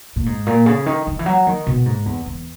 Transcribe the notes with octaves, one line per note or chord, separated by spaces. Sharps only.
A#2
G#2
A#2
C#3
D#3
D#3
E3
F#3
D#3
B2
G#2
E2
E2